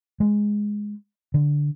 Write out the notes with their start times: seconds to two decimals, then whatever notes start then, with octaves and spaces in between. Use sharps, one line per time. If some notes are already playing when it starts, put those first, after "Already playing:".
0.20 G#3
1.34 D3